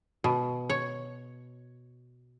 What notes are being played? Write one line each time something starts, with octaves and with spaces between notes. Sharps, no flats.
B2
C#5